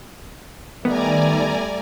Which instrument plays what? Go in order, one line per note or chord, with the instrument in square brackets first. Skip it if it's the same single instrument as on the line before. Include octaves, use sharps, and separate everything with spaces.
[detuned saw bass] D#3 [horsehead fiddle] G3 A3 [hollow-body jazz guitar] B3 [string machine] D5 G#5 A#5